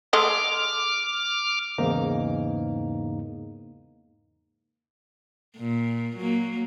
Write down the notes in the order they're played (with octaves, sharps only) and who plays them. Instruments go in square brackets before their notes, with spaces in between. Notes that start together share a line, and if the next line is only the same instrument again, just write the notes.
[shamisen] G#3 A3 D#5 [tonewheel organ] D6 F6
[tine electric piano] E2 G#2 C#3 A#3 D#4
[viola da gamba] A#2
F#3 A#3